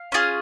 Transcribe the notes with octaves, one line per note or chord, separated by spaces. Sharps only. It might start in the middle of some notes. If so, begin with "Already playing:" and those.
Already playing: F5
C#4 F4 G#4